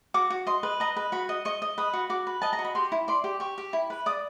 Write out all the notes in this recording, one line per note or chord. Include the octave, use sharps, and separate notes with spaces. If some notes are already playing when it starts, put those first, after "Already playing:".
F#4 D6
F#4
D#5 C6
B4
D#5 A#5
B4
F#4 B5
D#5
D#5 C#6
D#5
B4 D#6
F#4
F#4 D6
B4
D#5 A5
A#5
F#4
B5
G4 C6
E4
D5 C6
G4
G4 C#6
G4
E4
B4
D5 D#6